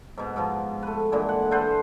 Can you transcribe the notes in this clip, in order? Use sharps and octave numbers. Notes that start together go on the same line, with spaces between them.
G#2 B2
G#2 B2 F3
A3 B4
A#2 D3 E3 G#3
F#5
A4 B4 C5 F#5